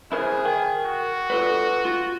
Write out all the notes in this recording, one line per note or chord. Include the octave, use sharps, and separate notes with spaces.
E4 G#4 A#4 C5
A#4 G5
F#4
F4 A4 B4
F4